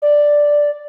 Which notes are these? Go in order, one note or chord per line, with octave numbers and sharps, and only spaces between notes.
D5